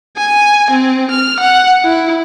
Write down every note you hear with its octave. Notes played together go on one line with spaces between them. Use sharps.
G#5
C4
F6
F#5
E4